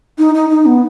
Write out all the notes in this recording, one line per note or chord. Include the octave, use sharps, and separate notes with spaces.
D#4
D#4
D#4
B3